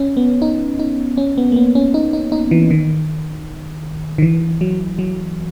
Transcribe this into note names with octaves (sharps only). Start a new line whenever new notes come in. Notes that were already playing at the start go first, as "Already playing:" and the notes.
Already playing: C#4
B3
D#4
D#4
C#4
B3
A#3
B3
C#4
D#4
D#4
D#4
E3
D#3
D#3
E3
F#3
F#3